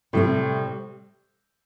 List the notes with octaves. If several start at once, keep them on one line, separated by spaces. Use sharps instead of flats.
A2 C3 G3 C4